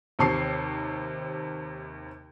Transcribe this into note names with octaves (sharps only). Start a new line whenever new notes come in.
D#2 C3 A5 C#6 C7